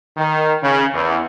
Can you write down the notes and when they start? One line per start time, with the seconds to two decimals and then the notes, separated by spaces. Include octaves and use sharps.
0.17 D#3
0.62 C#3
0.94 E2